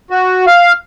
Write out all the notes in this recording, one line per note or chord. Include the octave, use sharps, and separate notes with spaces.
F#4
F5